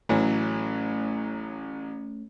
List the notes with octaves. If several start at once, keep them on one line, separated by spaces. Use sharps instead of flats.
A1 E3 F#3 A3 C#4